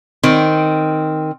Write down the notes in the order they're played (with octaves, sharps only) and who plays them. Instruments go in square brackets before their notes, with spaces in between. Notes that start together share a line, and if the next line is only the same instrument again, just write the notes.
[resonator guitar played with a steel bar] D#3 C4